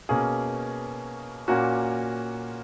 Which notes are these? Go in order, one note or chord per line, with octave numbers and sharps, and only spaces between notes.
B2 A#3 C#4 G#4
A#2 A#3 C#4 F#4